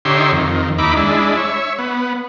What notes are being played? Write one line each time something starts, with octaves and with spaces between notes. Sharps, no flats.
D3 D#4 G4 C#5 E5 C6
F2 D#3
D#2 D#4 E4 B5 D6
G#3 D4 E4
C#5 E5
B3